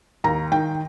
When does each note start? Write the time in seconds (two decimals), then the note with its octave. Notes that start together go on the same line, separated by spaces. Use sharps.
0.24 D#2 A#5
0.52 D#3 G5